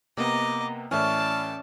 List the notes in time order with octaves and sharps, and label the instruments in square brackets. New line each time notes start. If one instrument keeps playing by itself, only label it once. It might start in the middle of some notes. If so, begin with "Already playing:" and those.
[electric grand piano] C3 A#3 B3 [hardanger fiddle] D#5 A#5 [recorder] D6
[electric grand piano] A2 E3 [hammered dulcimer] C#4 E5 [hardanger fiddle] D5 A5 [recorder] F6